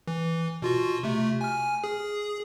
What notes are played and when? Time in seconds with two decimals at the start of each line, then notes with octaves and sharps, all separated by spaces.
0.08 E3
0.62 B2 F4 F#4
1.03 C3 A3
1.41 G#5 F6
1.84 G#4